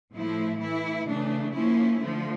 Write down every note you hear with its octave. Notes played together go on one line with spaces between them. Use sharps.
A2 F3 A3 E4
E3 A3 E4
C#3 E3 A3 D4
F3 A#3 C#4 E4
D3 F3 A3